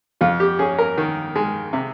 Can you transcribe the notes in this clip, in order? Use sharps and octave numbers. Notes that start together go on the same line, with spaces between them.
F2 F4
G4
C#4 G#4
A#4
D#3
G#3
C3